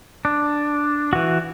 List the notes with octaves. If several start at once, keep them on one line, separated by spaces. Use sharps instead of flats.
D4
E3 F#4